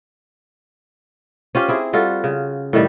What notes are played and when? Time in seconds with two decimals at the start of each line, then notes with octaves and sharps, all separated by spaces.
1.55 C#4 F4 G4 C5
1.68 C4 E4 G#4
1.93 G3 F4 F#4 A4
2.24 C#3
2.73 A2 D#3 G3